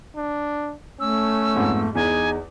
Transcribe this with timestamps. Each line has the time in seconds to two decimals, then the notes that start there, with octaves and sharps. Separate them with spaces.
0.16 D4
1.00 A3 C#4 E6
1.54 F2 G#2 B3
1.95 E2 D#4 G#4 G#5